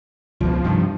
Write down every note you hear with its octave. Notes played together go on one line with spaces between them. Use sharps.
C#2 B2 F3
G2 C3 D#3